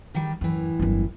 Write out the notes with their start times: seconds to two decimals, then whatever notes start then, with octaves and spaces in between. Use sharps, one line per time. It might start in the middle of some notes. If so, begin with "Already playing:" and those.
0.15 D#3 G3
0.41 F#2 A2 E3
0.79 G1 F#2